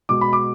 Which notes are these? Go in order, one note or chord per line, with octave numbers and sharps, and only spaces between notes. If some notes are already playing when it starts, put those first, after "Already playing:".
B2 G#3 D6
B5
D6